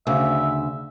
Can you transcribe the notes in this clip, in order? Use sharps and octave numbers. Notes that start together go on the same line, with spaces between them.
D2 C#3 E5